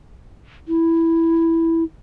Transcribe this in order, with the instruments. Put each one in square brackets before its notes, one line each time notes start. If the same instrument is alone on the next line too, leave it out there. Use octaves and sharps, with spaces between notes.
[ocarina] E4